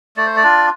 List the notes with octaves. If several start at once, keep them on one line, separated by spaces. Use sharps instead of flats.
A3 D5
C5
D5
D4 F4